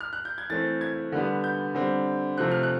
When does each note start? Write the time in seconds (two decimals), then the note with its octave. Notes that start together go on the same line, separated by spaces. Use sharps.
0.00 F6
0.13 F#6
0.25 G6
0.38 G#6
0.49 E3 A3 C4 A6
0.81 G#6
1.12 D3 G3 B3
1.44 G6
1.75 D3 G3 C4
2.38 C3 F3 A3 C4 F#6
2.51 F6
2.63 F#6